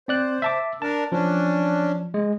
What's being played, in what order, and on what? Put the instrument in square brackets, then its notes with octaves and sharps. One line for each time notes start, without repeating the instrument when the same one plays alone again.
[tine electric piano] C4 D5 F#6 [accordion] C5
[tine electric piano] E5 A5 D6
[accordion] D4 A#4 [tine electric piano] A5
[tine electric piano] F3 [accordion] C#4 D4
[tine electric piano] G#3